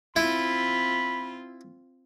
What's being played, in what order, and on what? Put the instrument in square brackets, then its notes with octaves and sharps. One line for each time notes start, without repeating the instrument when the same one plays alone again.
[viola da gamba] C4 F4 [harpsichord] E4 [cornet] B5